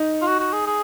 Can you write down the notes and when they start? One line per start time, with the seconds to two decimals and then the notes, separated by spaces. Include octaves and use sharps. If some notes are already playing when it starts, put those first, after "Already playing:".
Already playing: D#4
0.22 F4
0.27 F#4
0.40 F#4
0.53 G#4
0.67 G#4